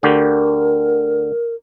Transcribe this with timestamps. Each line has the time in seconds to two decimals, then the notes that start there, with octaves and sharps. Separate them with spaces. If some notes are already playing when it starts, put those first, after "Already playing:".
0.03 D2 D3 G4 A#4